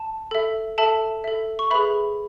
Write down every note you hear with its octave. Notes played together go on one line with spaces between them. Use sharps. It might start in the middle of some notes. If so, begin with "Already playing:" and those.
Already playing: A5
A4 E5
A4 E5 A5
A4 E5
C#6
G#4 B4 E5 B5